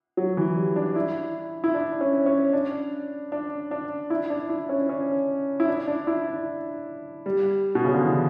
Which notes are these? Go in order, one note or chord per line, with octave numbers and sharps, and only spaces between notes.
F#3
E3
G3
D4
E4
E4
D4
C#4
C#4
D4
D4
D4
E4
D4
E4
C#4
C#4
E4
D4
D4
E4
D4
G3
B2
C#3
D3
E3